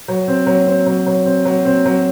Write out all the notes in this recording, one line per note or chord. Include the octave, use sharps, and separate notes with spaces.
F#3
C4
F#3
C4
F#3
F#3
C4
F#3
C4
F#3